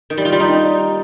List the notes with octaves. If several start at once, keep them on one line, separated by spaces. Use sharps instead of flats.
D#3
G3
F4
G3
D#4